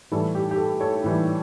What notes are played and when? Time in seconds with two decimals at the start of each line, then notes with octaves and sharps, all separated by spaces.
0.11 A2 E3 G3 A4
0.35 G4
0.51 G4
0.57 A4
0.80 A4 C#5
1.04 A2 E3 G3